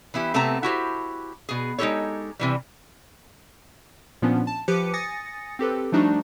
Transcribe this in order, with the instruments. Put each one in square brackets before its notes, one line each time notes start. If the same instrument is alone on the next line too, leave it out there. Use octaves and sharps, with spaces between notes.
[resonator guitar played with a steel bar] E3 B3 E4 G4
C3 A3 B3 C4 A5 A#5
E4 F#4 G4 C5
B2 G#4
G#3 D#4 F#4 G4 A4 C#5
C3 E3 G3
[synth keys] A#2 F3 B3 C#4 D4
A5
F3 G4 B4 D6 C#7 D#7
G#5 D#6 A6 A#6 C#7
C4 G4 A4 B4
F3 G3 A3 D4 D#4 F#4